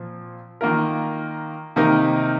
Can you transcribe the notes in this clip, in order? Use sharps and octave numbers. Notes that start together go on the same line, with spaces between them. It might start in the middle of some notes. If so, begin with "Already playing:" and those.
Already playing: A#2 F3 C4
D#3 A#3 F4 A#4
C3 D#3 A#3 D#4 A#4